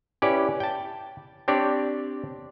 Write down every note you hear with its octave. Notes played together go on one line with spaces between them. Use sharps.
C#4 E4 G4 B4 D5
G5 A5
C4 D4 G4 C#5 D5